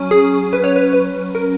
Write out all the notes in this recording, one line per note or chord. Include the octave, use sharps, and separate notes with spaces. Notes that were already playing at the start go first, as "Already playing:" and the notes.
Already playing: F#3 C#4
G#4
B4
C#5
B4
B4
A#4